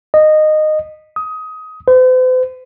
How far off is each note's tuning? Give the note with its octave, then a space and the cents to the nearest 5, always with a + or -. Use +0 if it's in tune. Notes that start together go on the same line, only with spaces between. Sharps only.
D#5 -15
D#6 +20
C5 -45